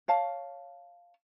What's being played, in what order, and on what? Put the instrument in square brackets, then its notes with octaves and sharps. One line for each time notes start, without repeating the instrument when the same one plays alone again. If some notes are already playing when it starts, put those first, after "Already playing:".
[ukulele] C#5 F5 A5